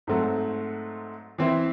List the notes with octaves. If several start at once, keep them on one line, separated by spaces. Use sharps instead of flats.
G#2 F#3 A3 C4 F#4
E3 C4 E4